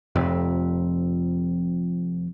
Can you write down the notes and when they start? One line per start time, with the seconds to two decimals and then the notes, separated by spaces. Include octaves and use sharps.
0.16 F1 F2 C3